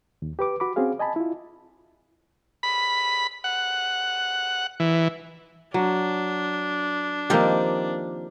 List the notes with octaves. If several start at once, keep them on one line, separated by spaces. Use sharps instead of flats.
D#2
G4 B4 D6
F#4 B5 D6
C4 C#4 F#4 G#4 F5
D#5 G#5 A5 B5
E4 F4
B5
F#5
E3
F#3 D4
D#3 F3 A#3 C4 G4